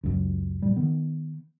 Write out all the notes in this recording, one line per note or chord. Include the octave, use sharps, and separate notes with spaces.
C#2 F#2
A2 G3
D#3 B3